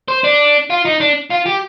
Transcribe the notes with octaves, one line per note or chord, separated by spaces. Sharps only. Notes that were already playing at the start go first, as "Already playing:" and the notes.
C5
D4
F4
D#4
D4
F4
G4